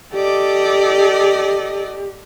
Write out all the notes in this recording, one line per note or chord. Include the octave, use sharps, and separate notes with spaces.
G4 A4 D5 D#5